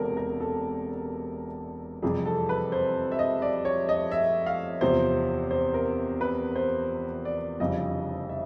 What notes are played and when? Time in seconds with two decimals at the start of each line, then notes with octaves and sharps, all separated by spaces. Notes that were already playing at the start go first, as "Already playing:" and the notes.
Already playing: E1 E2 C3 A4 A#4
0.17 A#4
0.40 A4
2.02 F2 C3 E3 G3 G#4
2.26 A4
2.49 B4
2.72 C5
3.12 E5
3.19 D#5
3.42 D5
3.65 C#5
3.89 D#5
4.11 E5
4.46 F5
4.81 E2 C3 F3 C5
5.51 C5
5.74 A#4
6.21 B4
6.55 C5
7.25 D5
7.60 F1 F2 C#3 E3 G3 D#5
8.29 E5